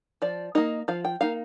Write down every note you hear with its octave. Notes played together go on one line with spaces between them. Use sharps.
F3 D5
A#3 D#4 D#5
F3 F5
G5
A#3 D#4 F5